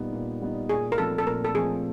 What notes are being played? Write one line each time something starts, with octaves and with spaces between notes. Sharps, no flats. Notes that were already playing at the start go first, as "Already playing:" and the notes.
Already playing: A#2 G3 B3 D#4
A#2
G3 B3 D#4
A#2 G#4
A#4
F3 A3 C4 A4
A4
A#2 A#4
A4
F3 A3 C4 G#4